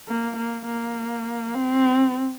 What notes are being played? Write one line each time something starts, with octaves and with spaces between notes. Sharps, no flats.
A#3
A#3
A#3
C4